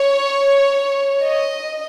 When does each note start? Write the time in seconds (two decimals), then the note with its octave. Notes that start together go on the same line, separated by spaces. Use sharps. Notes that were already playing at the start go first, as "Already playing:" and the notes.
Already playing: C#5
1.24 D#5